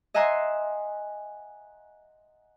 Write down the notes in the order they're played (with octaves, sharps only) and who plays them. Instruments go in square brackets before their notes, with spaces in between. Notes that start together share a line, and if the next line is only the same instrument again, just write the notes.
[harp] D#5 E5 F#5 G#5 A#5 C6